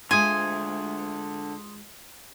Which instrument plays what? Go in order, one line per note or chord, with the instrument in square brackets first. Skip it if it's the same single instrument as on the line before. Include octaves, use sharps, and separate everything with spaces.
[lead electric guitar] D3 E5 [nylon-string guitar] G#3 F4 [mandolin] G#5 [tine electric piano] C6 D#6